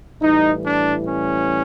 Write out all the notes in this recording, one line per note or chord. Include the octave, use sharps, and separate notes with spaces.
A2 E3 G3 D#4
D4
C#4